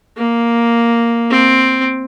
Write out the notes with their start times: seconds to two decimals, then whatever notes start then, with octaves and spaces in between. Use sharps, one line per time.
0.17 A#3
1.30 C4